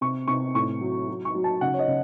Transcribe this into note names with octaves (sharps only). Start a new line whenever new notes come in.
C3 C#6
C3 C#6
A2 C#6
F#3
F#3
C#6
F#3
A5
C#3 F#5
C#5
D#5
C#3